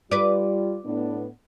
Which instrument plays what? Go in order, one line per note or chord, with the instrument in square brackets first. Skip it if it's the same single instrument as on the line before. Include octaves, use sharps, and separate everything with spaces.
[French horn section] G3 F4 [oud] B4 D5
[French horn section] A2 B3 D4